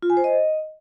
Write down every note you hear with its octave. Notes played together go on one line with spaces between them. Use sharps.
F4
G#5
C5
D#5